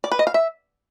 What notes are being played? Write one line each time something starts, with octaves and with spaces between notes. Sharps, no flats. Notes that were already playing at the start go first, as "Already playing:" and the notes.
D5
B4
D#5
F5
E5